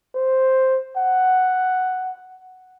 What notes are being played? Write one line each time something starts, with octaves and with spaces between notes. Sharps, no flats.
C5
F#5